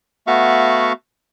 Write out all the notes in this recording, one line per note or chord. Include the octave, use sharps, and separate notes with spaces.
A3 B3 F#4 E5 F5 C#6